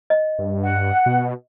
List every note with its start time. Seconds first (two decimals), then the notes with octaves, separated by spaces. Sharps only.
0.10 D#5
0.39 G2
0.63 F#5
1.06 B2